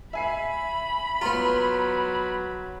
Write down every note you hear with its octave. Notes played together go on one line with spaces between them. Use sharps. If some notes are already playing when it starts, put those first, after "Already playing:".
E5 G#5 B5 C7
F#3 B3 F4 A#5 C6